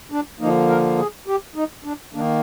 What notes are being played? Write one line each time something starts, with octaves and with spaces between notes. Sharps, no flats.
D4
D3 F3 A#3 D#4
A#4
G#4
G4
D#4
D4
D#3 A#3 D4